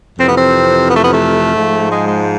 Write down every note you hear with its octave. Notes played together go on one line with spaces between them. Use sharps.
F2 C3 E3 C4
B3
C4
B3
A3
B3
A3
G#2 F3
G#3
G#3